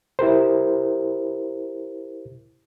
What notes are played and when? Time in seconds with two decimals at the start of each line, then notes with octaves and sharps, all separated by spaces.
0.19 E4 G4 A#4 C5